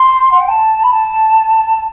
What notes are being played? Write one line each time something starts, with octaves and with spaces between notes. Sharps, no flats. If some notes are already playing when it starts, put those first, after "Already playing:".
Already playing: C6
F#5
G5
A5
B5
A5